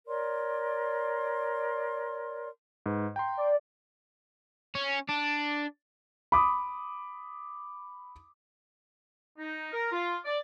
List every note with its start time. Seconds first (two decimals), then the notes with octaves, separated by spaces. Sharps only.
0.07 A#4 C#5 D5 C6
2.86 G#2 B4
3.16 G5 A#5 C6
3.37 D5
4.75 C#4
5.09 D4
6.32 B5 D6 D#6
9.38 D#4
9.72 A#4
9.92 F4
10.25 D5